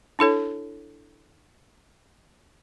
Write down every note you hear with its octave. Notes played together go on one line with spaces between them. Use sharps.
D4 E4 A4 C#5